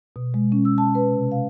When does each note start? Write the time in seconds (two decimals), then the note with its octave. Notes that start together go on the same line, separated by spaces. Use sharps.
0.16 B2
0.34 G#3
0.52 C#4
0.65 E6
0.78 A5
0.95 B4
1.11 C3
1.31 F5